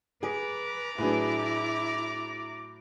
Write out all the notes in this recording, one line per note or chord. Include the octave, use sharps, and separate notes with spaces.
G#4 B4 D5 A#5 D6
A2 F#3 D4 E4 G#4 B4